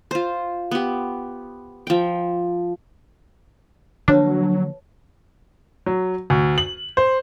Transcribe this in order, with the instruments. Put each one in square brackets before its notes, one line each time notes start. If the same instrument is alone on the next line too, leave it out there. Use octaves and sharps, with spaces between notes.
[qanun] F4 C5
B3 G4
F3 G5
[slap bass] D3 F3 A#3 [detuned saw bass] F#3 [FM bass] D4 [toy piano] B4 C#5 A5
[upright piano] F#3
D2
F#7
C5